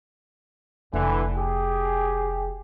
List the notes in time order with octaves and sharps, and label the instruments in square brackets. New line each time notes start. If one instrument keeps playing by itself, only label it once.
[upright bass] F1 [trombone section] D3 E3
[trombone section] G4 G#4